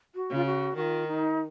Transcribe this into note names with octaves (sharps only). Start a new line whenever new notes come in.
F#4
C#3
F4
F#4
D#3 F#4
F4
D#4